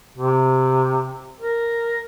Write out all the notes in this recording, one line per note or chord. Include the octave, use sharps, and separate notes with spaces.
C3
A#4